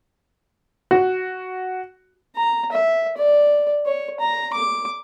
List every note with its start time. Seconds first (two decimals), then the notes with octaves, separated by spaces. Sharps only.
0.91 F#4
2.36 A#5
2.72 E5
3.17 D5
3.86 C#5
4.20 A#5
4.54 D6